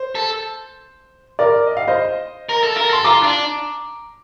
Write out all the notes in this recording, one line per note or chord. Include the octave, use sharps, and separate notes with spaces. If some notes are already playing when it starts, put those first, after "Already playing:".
Already playing: C5
A4
A#4 D5
D#5
F5
C5 D#5
A#4
A4
A#4
A4 C6
F4 A#5 D6
D4